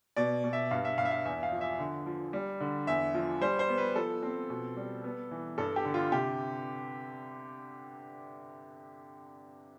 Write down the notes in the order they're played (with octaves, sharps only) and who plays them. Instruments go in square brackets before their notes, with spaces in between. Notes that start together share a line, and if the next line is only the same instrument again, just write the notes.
[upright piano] B2 D5
B2
E5
G2 F5
E5
G2 F5
E5
F5
E2 E5
F5
F3
E5
D3
F3
G3
D3
E2 E5
F3
G3 C5
C5
B3
B4
F3 A4
C4
B2
G3
B3
E3
G2 A4
G4
D3
F4
C3 G4